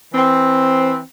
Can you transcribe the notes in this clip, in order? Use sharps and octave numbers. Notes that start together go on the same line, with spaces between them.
E3 C4